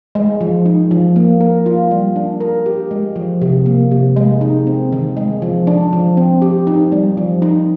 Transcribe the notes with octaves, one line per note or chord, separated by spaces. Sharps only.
G#3
F3
D#4
F3
A#3
A#4
F4
G3
D4
A#4
G4
G#3
F3
C3
A#3
C3
G#3
D#4
C4
D#3
G#3
F3
D4
F3
C4
G4
D#4
G3
F3
D#4